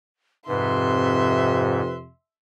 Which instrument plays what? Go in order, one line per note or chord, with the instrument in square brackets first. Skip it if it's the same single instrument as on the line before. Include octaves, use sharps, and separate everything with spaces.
[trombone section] F2 C3 [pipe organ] G#2 [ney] B4 [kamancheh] E5 C6